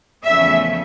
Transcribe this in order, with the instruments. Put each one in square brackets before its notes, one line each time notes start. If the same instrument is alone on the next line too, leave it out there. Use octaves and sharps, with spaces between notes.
[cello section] E2 C#3 F3 A3 C#4 E5